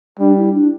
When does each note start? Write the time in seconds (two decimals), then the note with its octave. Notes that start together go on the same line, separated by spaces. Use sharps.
0.19 G3 D4
0.37 E4
0.54 D4